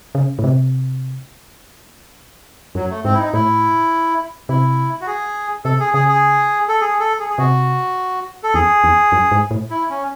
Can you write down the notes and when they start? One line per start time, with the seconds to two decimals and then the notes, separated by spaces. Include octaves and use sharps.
0.15 C#3
0.39 A2
0.44 C3
2.75 F#2 F#3
2.90 A3
3.04 G#2 C4
3.14 E4
3.19 D#4
3.33 A2 E4
4.49 C3 E4
5.01 F#4
5.07 G#4
5.65 C3 A4
5.80 G#4
5.94 C#3 G#4
6.09 G#4
6.68 A4
6.81 G#4
7.00 A4
7.20 G#4
7.30 G#4
7.38 C3 F#4
8.43 A4
8.54 E2 G#4
8.84 E2
9.12 F#2
9.31 G#2
9.51 A2
9.70 E4
9.90 C#4